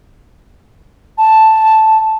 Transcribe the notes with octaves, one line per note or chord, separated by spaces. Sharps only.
A5